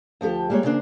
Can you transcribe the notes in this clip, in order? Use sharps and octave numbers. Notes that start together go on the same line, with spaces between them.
D2 F3 G4 A4
G3 G#3 A#3 G4 C#5
C#3 E3 A#3 D4 C5